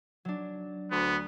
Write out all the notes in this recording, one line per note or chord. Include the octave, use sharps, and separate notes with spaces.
F#3 D4
D2 B3